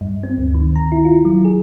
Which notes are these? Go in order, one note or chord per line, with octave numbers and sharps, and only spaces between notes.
G2
C4
D2
D#3
A#5
E4
F4
F#3
G#4